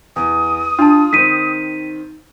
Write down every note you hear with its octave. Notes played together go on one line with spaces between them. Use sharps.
E2 D#6
D4 F4 A5
D#3 C4 B6 D#7